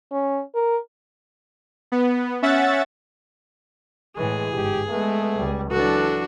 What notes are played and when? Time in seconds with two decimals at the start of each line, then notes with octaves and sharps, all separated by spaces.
0.11 C#4
0.55 A#4
1.92 B3
2.42 C#4 E5 F#5 A6
4.17 A2 E3 G#3 G#4
4.53 G1 G#2 G4
4.89 G#3 A3 B3
5.37 C#2 G3
5.71 E3 F#3 D4 F#4 A4